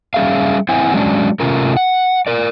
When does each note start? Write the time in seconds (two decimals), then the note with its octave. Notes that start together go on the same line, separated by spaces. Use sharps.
0.14 G3 C#4 G#4 E5 F5
0.69 C4 E4 C5 E5 F#5 G#5
0.93 F#3 G#3 C#4 D4
1.40 C3 A3 C#4 F4 A#4
1.77 F#5
2.27 A#4 D5